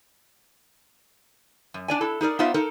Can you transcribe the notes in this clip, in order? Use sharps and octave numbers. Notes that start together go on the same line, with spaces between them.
F#2
D4 D5 G#5
E4 A4
D#4 G#4 A#4 D5
B3 D#4 F4 C5 D5 E5
D#4 A4 A#4